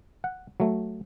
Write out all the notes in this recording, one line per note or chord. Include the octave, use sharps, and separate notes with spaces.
F#5
F#3 A3